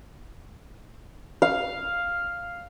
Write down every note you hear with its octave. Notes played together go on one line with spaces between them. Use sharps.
F5